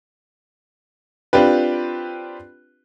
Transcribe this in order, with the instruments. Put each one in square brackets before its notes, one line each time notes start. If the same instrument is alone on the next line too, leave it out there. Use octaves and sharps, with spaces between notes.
[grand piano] C4 D4 F4 G4 B4